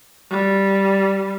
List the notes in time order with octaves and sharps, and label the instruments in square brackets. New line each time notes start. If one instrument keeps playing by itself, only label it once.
[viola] G3